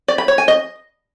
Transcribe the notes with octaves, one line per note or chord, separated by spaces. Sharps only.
D5
B5
C#5
G#5
D#5